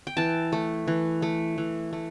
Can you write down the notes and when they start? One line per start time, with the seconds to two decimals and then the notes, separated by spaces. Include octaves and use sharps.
0.07 G5
0.17 E3 A5
0.53 A3
0.88 E3
1.22 A3
1.58 E3
1.93 A3